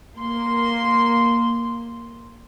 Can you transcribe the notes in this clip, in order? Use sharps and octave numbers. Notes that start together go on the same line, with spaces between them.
A#3 C6